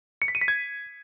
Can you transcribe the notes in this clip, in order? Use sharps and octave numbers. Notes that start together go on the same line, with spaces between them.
C#7
B6
D#7
B6
G#6